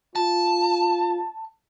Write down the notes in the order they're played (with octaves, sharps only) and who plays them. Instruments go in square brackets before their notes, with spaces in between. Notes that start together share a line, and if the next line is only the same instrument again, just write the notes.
[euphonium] F4 [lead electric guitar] A5